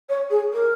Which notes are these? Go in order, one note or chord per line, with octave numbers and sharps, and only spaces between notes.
C#5
G#4
A#4